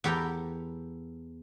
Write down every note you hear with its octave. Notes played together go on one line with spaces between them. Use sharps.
E2 G4 A4 G5 A#5